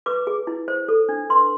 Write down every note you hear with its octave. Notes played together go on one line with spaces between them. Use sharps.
B4 D6
G#4
E4
C5
A4
D4
B4 C6